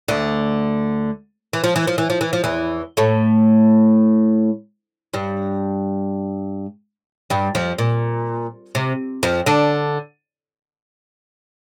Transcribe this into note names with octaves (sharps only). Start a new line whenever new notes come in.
D2 D3
E3
F3
E3
F3
E3
F3
E3
F3
E2 E3
A2 A3
G2 G3
G2 G3
F2 F3
A#2
C3
F2 F3
D3 D4